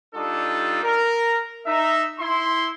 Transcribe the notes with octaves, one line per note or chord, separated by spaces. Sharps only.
G3 D4 D#4 F4 A4
A#4
D#4 E5
E4 C6